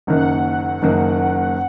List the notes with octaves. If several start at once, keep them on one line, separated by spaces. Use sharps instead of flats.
F#1 F#2 D#3 A#3 F#5
F#1 F#2 D#3 A#3